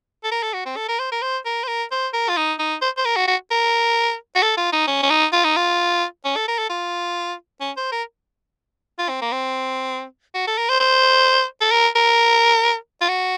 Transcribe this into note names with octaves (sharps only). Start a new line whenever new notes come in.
A4
A#4
A4
F#4
C4
A4
A#4
C5
A#4
C5
A#4
C5
A#4
C5
A#4
F4
D#4
D#4
C5
C5
A#4
F#4
F#4
A#4
F#4
A4
F4
D#4
C#4
C#4
D#4
F4
D#4
F4
C#4
A4
A#4
A4
F4
C#4
C5
A#4
F4
C4
A#3
C4
F#4
A4
A#4
C5
C5
A4
A#4
A#4
F4
F#4